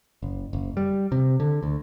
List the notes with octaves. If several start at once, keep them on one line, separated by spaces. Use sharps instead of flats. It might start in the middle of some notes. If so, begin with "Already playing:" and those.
F#1
F#1
G3
C3
D3
D2